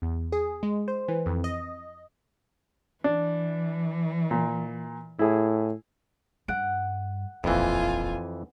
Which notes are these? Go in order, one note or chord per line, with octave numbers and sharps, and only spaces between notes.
E2
G#4
G#3
C5
E3
F2
D#5
E3 D4
A#2
A2 E4 G#4
G2 F#5 D7
D#1 A1 F2 E3 F4 G#5